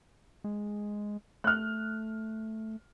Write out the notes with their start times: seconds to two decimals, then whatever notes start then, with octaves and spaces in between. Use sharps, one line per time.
0.44 G#3
1.44 A3 F6 F#6